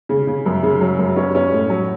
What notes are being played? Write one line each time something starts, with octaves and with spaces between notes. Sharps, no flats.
C#3
C#3
F#2
C#3
F#3
F#2
C#4
C#4
A2
F#3